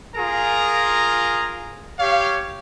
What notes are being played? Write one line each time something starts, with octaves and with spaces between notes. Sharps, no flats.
F4 G#4 A#4 A#5
G4 C#5 F5